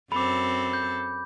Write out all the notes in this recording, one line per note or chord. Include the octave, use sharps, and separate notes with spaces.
F#2 C4 A4 B5 D6
G6